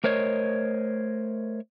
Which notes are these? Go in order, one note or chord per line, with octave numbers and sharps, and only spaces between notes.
A3 A#4 C5 C#5 D#5